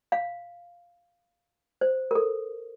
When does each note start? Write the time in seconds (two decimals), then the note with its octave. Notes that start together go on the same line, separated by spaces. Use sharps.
0.12 F5
1.81 C5
2.11 A#4
2.15 A4